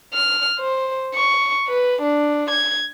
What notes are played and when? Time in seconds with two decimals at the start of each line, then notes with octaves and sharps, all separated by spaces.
0.14 F6
0.59 C5
1.15 C#6
1.68 B4
2.02 D4
2.51 G#6